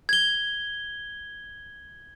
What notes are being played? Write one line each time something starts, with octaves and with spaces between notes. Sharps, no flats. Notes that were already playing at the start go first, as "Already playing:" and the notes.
G#6 G7